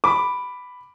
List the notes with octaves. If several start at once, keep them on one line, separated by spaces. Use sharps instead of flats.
B5 D6